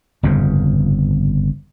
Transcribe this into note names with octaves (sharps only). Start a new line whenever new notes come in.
G1 F2 G#2 C#3